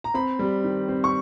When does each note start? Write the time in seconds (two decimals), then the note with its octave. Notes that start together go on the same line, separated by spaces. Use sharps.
0.04 A#5
0.14 C4 B5
0.39 G3
0.64 D#3
0.89 C4
1.04 C#6